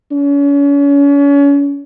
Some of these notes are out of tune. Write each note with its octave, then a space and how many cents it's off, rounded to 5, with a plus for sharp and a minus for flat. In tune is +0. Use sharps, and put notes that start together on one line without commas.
C#4 +35